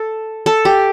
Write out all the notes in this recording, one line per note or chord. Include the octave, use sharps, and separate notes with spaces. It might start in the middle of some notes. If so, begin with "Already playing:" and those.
Already playing: A4
A4
G4